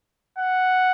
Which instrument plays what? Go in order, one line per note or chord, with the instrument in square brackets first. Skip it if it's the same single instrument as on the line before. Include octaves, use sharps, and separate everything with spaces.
[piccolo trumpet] F#5